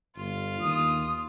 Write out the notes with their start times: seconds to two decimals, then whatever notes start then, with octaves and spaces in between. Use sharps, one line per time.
0.17 G1 F4
0.61 D#2 D#6